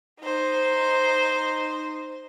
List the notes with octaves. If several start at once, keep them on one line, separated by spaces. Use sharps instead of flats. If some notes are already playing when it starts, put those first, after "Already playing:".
D#4 C5